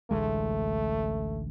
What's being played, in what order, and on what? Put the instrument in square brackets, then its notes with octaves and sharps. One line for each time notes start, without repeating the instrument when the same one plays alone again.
[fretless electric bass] A1 D2 G#3 [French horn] A3